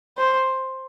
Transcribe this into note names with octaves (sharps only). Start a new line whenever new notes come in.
C5